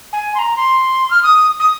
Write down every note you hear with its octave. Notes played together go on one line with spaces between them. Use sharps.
G#5
C6
A#5
C6
F6
D#6
D#6